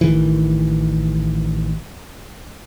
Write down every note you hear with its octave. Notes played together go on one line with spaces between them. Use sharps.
A1 D#3 E3